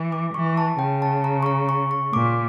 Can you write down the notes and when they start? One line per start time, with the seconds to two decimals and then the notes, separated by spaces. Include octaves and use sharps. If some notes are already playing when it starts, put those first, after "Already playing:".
Already playing: E3
0.12 D6
0.34 E3 C#6
0.58 A5
0.79 C#3 G5
1.02 A5
1.24 A#5
1.43 C#6
1.46 A#5
1.69 C#6
1.91 C#6
2.13 A#2 D6